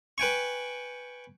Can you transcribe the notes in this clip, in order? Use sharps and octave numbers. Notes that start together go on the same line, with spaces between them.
B4 G5 G#5 C#6